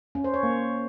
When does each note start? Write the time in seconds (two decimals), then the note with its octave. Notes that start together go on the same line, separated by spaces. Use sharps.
0.15 C#4
0.24 C5
0.34 C#5
0.43 A#3